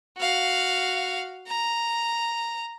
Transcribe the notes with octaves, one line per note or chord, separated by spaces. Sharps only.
F#4 F5
A#5